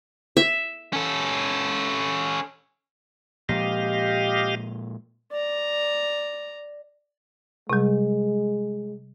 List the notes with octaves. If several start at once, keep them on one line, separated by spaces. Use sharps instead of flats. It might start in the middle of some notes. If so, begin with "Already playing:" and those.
E5
C#4 A4
A#2 F3 G#3 G4 D#5 F5
D5 A#5
C3 G3 G#3